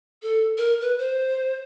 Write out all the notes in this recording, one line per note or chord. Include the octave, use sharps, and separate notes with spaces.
A4
A#4
B4
C5